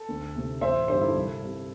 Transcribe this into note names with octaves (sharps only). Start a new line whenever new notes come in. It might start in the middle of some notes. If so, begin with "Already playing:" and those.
Already playing: A4
D2
C3 A3
A1 C5 E5
G2 D3 G4 C5
E4 A4
C2
C3 G3